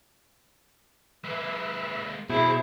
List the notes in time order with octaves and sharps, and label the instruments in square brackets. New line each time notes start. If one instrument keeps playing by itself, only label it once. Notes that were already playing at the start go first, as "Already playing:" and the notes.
[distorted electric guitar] G#3 A#3 [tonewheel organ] B4 E5
[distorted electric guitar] B1 C4 [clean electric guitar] B2 [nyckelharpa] E4 [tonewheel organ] G#4 C5